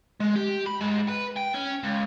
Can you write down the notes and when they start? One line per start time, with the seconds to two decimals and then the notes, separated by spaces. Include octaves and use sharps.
0.20 G#3
0.36 G4
0.66 B5
0.80 G#2
1.08 B4
1.36 G5
1.54 C#4
1.83 C#2